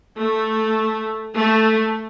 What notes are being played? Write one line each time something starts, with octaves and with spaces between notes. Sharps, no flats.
A3
A3